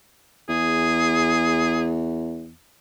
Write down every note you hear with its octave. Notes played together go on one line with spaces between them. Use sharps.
E2 G#4